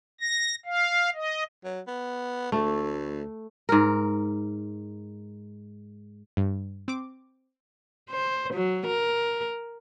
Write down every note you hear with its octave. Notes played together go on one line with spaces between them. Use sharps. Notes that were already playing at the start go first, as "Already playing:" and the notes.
A#6
F5
D#5
F#3
B3
D2 A3
G#2 A#4
G2
C4 D6
C5
F#3
A#4